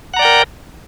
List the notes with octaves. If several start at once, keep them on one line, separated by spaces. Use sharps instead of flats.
A#4 D5 F#5 G5 A#5